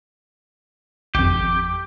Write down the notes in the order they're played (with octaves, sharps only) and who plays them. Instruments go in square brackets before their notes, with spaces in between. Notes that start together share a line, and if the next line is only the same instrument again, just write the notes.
[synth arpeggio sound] G#1 F2 [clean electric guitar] G4